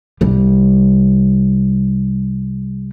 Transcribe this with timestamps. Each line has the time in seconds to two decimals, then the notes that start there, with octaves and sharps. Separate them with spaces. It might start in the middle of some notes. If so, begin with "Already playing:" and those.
0.21 C2 G3